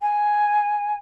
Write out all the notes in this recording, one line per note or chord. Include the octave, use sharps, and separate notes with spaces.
G#5